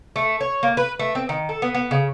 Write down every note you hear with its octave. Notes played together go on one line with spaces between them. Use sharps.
A3
C#5
A#3
B4
A3
C4
D#3
A4
B3
B3
C#3